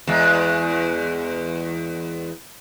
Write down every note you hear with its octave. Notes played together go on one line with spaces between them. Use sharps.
E2 G#3